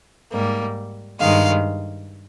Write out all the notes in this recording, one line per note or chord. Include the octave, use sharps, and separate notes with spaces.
G#2 G3 A#3
G2 D#3 G#3 F5